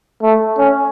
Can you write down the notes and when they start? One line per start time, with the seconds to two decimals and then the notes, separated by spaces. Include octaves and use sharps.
0.22 A3
0.58 C#4